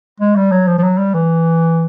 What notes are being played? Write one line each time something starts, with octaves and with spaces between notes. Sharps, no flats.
G#3
G3
F#3
F3
F3
F#3
G3
E3